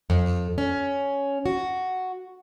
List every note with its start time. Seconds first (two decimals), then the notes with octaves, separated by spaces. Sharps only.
0.10 F2
0.58 C#4
1.46 F#4